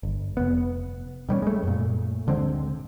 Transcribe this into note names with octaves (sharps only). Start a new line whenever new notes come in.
G1
F1 B3
B2 G3 B3 C#4
G#3 A3
F#2 A#2
D1 D3 G#3 C4